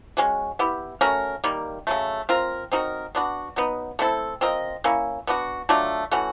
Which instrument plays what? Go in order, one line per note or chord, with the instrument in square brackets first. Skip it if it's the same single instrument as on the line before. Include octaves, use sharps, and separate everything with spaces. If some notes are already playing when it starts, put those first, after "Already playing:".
[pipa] G#3 C#4 F#4
B3 E4 G4
A3 C#4 F#4 A#4
D#3 G3 A#3
C#3 F#3 A3
C4 F4 A#4
C4 D#4 F#4 A#4
B3 D4 F#4
F#3 B3 D#4
A3 C4 E4 A4
C4 F4 A#4 D#5
A#3 C#4 E4
B3 D4 F#4
F#3 A3 D4 F4
E3 A3 C#4 F#4